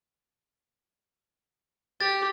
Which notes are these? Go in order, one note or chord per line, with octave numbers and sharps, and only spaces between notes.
G4 A6